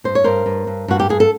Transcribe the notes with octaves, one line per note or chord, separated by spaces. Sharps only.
G2 C5
C#5
G2 A#4 C5
G2
G2
G2 F#4
G4
G2 G#4
A4